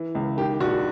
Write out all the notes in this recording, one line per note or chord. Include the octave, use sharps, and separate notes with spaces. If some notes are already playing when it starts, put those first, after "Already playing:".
Already playing: E3
C#2
D#3 G4
A#1 F#4